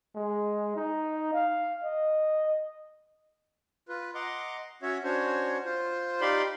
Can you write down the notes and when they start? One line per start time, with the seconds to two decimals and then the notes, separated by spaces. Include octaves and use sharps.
0.15 G#3
0.76 D#4
1.33 F5
1.84 D#5
3.88 F4 B4
4.15 D#5 F#5 A#5 C6 D6
4.82 C#4 F#4 C#5 E5
5.04 C#4 D4 F#4 C5 C#5
5.65 F4 C5
6.21 D#4 G4 D5 F5 B5 C6